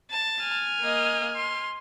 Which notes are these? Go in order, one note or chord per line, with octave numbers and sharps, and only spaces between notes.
A5
G#5 F6
A#3 D#5
C6